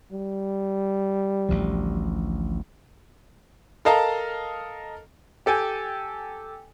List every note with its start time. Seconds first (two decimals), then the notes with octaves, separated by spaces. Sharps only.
0.12 G3
1.49 A1 D2 F3
3.85 A4 A#4 D#5 F5 A5 A#5
5.46 G4 A4 G5 G#5